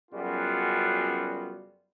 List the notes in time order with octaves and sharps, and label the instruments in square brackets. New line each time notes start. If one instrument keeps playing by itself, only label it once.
[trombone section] F#2 C#3 G3 B3 F4 F#4